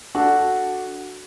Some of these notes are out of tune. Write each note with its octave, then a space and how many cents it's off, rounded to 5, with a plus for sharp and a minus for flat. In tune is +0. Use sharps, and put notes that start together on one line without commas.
D4 +0 F#4 +0 A4 -5